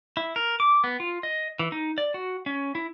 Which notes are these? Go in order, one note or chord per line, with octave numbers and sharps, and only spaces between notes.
E4
A#4
D6
B3
F4
D#5
E3
D#4
D5
F#4
C#4
E4